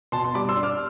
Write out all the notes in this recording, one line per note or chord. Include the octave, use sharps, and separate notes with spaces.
B2 A5 C6
C6
G3 B5 D6
C6 E6
D4
D6 F6